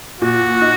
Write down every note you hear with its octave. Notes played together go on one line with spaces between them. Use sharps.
A#2 F#4
D#4